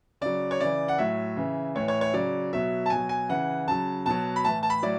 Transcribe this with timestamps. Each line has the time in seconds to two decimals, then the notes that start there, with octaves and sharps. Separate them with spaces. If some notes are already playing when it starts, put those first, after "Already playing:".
0.21 C#3 F#3 D5
0.51 C#5
0.60 C#3 E3 D5
0.88 F#5
0.98 A2 F#3 E5
1.36 C#3 E3
1.75 A2 E3 C#5
1.88 C#5
2.01 C#5
2.13 C#3 F#3 D5
2.53 B2 F#3 E5
2.86 A5
2.90 B2 F#3 G#5
3.09 G#5
3.29 C#3 E3 F#5
3.67 C#3 F#3 A5
4.06 B2 F#3 A5
4.36 B5
4.44 A2 E3 A5
4.63 A5
4.70 B5
4.82 A2 F#3 D5